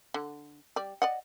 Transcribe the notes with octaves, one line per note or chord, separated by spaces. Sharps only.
D3
G3 D5
D5 D#5 F#5